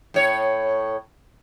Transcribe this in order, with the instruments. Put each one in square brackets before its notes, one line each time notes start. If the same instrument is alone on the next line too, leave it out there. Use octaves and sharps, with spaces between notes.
[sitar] A2 C#5